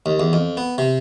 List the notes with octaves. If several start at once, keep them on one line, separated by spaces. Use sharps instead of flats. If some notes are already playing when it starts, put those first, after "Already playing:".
D#2
E2
F2
B3
C3